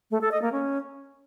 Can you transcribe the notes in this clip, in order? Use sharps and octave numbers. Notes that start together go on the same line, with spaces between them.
A3
A4
D#5
A#3
C#4